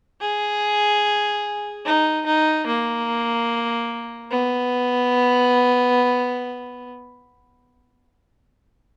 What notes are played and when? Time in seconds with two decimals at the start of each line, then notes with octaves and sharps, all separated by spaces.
0.21 G#4
1.86 D#4
2.26 D#4
2.67 A#3
4.31 B3